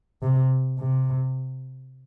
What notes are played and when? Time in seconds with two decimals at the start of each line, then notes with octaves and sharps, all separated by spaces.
0.23 C3
0.80 C3